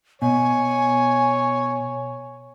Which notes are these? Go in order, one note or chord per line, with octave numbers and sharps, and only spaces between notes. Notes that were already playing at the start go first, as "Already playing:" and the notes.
B2 C#5 G#5